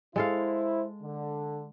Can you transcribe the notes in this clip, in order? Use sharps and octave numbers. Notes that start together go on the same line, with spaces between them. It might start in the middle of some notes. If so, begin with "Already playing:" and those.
G#3 E4 A4 C5 F5
D3